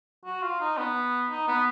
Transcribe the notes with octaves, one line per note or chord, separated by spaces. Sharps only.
F#4
F4
D#4
B3
D#4
B3